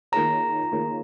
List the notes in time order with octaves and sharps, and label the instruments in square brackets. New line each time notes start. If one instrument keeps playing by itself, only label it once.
[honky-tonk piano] D#3 A#3 F4 G#4 C#5 [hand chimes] A#5
[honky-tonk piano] D#3 A#3 F4 G#4 C#5